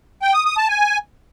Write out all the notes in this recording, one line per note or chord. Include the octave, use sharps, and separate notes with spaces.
G5
D#6
D#6
A5
G#5